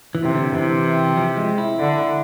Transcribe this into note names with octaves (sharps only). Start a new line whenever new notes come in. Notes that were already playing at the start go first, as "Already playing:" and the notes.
E3
C3
D3
C3 E3
F3
G#3
E4
D3